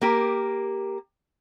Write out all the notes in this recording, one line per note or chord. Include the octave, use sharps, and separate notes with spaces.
A#3 G4 A#4